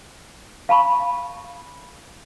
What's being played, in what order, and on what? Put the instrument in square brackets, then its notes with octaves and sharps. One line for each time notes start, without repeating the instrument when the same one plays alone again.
[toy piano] F5 A5 B5 C#6